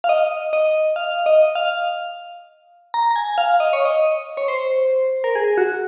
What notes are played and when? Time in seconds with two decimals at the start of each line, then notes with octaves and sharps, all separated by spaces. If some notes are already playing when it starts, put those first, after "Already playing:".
0.04 F5
0.09 D#5
0.53 D#5
0.96 F5
1.26 D#5
1.55 F5
2.94 A#5
3.11 A#5
3.16 G#5
3.38 F5
3.60 D#5
3.73 C#5
3.85 D#5
4.37 C#5
4.48 C5
5.24 A#4
5.35 G#4
5.58 F#4